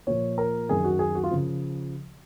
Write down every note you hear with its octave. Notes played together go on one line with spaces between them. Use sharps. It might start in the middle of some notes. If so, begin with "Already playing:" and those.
A#2 F3 C#5
A#4
F#2 D#3 G#4
F#4
G#4
F#4
F4
C#3 F3